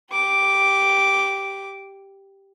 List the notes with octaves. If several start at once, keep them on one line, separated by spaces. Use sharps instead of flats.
G4 D6